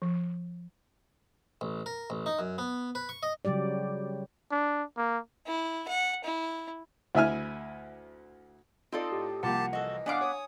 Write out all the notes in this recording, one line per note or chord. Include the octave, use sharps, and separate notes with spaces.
F3
A1
A#4
A1
D#4
F#2
B3
B4
C#6
D#5
C#3 F#3 G3 G4 D5
D4
A#3
E4
F#5
E4
D2 E4 E5 G#5 F6
C4 D#4 F4 A4 D5 D#5
A2 G4
C2 F3 A#3 F4 G4 F#5 A5
E3 F#4 A4 D#5
B3 D4 F5 F#5 G#5 D6
C#5 D#6